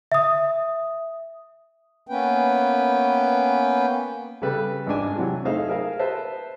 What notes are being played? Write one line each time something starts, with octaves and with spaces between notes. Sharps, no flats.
E5 D#6
A#3 B3 C#4 B4 G5
C#3 G3 A4 B4
G#1 G#3 D4 G#5
C3 E3 F#3
A3 D#4 G#4 C5 E5 F5
G#4 A#4 E5 F5
B4 C5 E5 A5